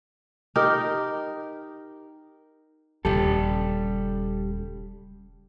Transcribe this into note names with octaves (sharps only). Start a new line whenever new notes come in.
D#4 G4 A#4
D#1 C#3 G3 G4 A4